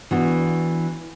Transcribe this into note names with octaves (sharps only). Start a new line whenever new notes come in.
E3 B3 D4 F#4